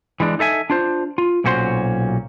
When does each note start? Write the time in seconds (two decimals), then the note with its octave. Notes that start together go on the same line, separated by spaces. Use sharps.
0.20 E3 G#3 D4
0.39 D#4 A4 E5 G#5
0.70 D4 F4 C5
1.18 F4
1.44 B1 A#2 C#4 F#4 C5 C6